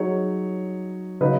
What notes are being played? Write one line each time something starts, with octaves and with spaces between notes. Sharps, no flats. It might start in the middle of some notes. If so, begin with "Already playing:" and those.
Already playing: F#3 D#4 G#4 C#5
C#3 F#3 D#4 B4 D#5